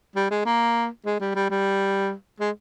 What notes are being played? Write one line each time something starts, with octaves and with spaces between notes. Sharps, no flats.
G3
G#3
A#3
G#3
G3
G3
G3
G#3